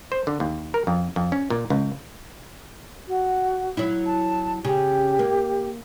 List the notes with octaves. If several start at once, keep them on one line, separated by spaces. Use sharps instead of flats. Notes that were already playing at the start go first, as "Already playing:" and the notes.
C5
D3
D#2
A#4
F2
F2
C#4
A#2
C#2
F#4
F#3 E4
A5
C#3 G4
A#3